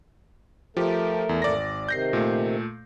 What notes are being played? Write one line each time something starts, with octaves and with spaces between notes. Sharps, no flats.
F3 A3 G4 A4 A#4
E2
G#1 D5 A#6
C3 D#3 G6 A#6 C7
A#2 A3